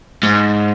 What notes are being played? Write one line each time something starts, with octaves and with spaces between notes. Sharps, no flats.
G#2